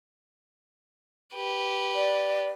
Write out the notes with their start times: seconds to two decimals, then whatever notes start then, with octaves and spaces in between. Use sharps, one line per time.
1.35 G4 B4
1.95 D5